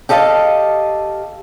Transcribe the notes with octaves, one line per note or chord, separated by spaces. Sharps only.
G4 A4 D#5 F5 F#5 A5